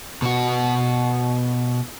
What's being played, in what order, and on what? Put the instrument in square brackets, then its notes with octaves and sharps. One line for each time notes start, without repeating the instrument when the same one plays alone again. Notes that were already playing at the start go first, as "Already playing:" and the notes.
[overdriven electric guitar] B2 F#4